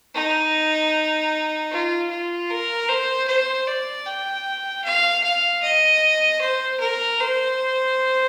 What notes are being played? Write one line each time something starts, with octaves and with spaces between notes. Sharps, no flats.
D#4
F4
F4
A#4
C5
C5
D5
G5
F5
F5
D#5
C5
A#4
C5